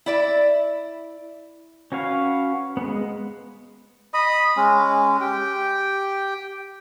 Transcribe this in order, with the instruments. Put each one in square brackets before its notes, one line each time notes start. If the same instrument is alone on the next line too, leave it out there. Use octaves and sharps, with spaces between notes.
[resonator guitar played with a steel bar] E4 D5 E5
[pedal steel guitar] C#4 F#4 B4 F5
G#3 B3
[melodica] D#5 B5 D#6
G#3 C#4
G4 G5